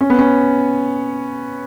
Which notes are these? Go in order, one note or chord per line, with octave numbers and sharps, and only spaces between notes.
C#4
B3
C#4